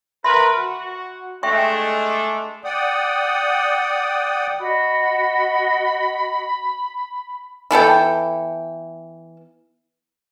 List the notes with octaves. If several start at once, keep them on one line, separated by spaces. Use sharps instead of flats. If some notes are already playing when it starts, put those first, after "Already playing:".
A#4 B4 E5 B5 C6
F#4
G#3 A3 D4 E5 G5 C#6
D5 F#5 G5 D#6
F#4 D#5 B5
E3 B3 A4 G5